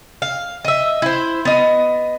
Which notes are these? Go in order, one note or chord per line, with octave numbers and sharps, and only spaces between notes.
F5
D#5 E5
E4 C5
B3 D#5